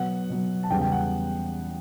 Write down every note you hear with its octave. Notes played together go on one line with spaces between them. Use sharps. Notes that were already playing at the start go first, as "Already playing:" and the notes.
Already playing: B2 F#3 B3 F#5
B2 F#3 B3
A5
E2 C#3 G3 B3 G5
G5
F#5